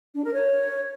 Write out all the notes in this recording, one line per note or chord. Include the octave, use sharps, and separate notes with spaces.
D4
A#4
C#5